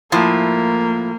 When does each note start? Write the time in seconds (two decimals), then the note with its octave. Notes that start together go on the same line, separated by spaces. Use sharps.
0.12 A2 F3 A#3 E4